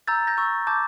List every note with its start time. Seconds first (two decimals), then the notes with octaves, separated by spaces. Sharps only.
0.07 A#5 E6 G6 A6
0.27 G6 A#6
0.37 C#6 E6 G6
0.67 A5 D6 G6